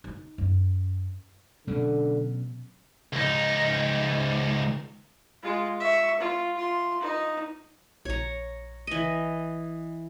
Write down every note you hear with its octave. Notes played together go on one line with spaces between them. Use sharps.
D#4
F#2
B2 D3 F#3 C#4
C#2 D#4
G#3 F4
E5 C#6
F4
F4 C6
D#4
A#1 C#5 A#5
E3 D#5